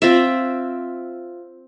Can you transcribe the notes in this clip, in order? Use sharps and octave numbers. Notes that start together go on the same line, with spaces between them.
C4 F4 E5